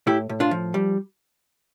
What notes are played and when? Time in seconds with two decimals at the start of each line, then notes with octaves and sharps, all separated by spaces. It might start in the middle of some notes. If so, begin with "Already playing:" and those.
0.07 A2 E4 G4
0.29 A2
0.40 D4 F4
0.51 F3
0.74 G3